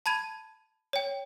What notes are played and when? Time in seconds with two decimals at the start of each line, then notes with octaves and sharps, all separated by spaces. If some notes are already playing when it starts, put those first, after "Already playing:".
0.06 A5 B5 G#6 D#7
0.93 C#5 G5